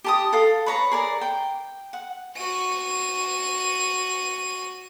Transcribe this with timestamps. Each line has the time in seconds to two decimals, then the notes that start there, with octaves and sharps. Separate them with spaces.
0.04 G4 A5 D#6
0.33 A4 F5
0.66 B4 C#5 A#5
0.91 G#4 A#4 D5
1.21 G5
1.93 F#5
2.37 F#4 D#7